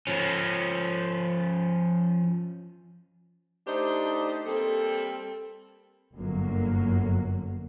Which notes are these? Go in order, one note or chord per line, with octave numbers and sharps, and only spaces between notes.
F3 C#4
A3 D4 D#4 G4 C5
G3 A#3 C4 A4
G1 F#2 D3 F#3 A#3